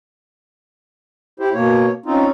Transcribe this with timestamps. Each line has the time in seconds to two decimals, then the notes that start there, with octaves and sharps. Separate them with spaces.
1.40 E4 G4 C5
1.54 B2 A#3 C#5
2.06 C4 C#4 D#4 F4